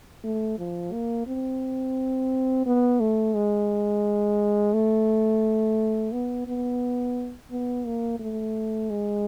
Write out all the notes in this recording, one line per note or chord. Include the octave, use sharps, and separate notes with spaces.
A3
F3
A#3
C4
B3
A3
G#3
A3
B3
B3
B3
A#3
A3
G#3